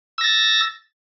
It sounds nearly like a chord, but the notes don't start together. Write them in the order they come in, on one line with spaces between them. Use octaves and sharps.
E6 A#6 A6